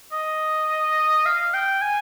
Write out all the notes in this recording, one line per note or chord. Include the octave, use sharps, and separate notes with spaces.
D#5
F5
G5
G#5